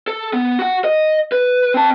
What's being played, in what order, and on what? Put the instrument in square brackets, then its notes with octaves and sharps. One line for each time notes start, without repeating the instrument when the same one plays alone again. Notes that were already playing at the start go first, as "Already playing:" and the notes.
[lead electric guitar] A4
B3
F#4 F#5
D#5
B4
C4 A5